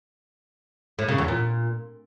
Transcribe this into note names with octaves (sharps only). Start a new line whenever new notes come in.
A2
C#3
E2
A#2